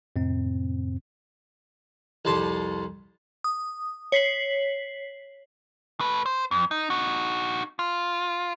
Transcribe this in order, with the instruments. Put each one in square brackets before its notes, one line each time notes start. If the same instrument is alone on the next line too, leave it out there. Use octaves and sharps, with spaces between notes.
[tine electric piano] F2 A2 C3 C4
[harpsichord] C2 F2 A5 C6
[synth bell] D#6
C#5 B6 C7 F#7
[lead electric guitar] A3 B4
C5
F2
D#4
D#4 F#4
F4